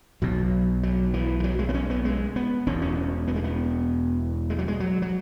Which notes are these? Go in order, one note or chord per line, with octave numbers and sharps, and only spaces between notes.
B1 B2 F#3
F#3
E3
E3
F#3
G#3
B3
C#4
B3
G#3
B3
E1 E2 B2 C#4
C#4
B3
G#3
B3
G#3
F#3
G#3
F#3
F#3